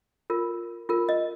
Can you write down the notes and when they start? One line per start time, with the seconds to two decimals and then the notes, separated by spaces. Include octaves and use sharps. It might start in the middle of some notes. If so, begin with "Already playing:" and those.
0.30 F4 A#4
0.89 F4 A#4
1.09 D#5